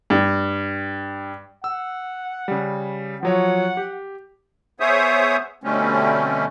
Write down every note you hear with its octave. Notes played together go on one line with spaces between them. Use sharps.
G2
F#5 E6
C#3 G3
F3 F#3 C#5 F#5
G4
B3 G#4 C5 C#5 E5 D#6
B2 D3 G3 A3 C4 C#4